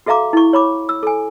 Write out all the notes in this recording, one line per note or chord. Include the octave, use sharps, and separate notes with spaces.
F#4 A4 E5 F5 A#5 D6
E4 C#6
C#5 B5 D6
E6
A4 G#5